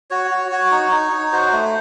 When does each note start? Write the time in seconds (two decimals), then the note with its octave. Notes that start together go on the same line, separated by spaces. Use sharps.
0.10 F#4 C#5
0.31 F#4
0.52 F#4
0.71 D#4
0.92 D#4
1.12 D#4
1.32 F#4 C5
1.53 A3